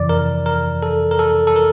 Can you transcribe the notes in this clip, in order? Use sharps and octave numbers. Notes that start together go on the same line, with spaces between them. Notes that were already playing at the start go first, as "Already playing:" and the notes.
Already playing: F2 C3 E3 D5
A#4
A#4
A4
A#4
A4
A4
A#4